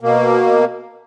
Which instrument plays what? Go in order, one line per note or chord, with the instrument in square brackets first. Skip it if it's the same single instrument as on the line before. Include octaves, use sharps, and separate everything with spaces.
[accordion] B2 A#3